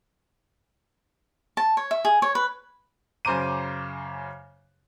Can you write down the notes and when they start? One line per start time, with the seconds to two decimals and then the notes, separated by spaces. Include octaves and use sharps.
1.57 A5
1.77 C#5
1.91 E5
2.05 G#4
2.22 C#5
2.35 B4
3.25 F#2 C#3 C5 A#5 D6 D#7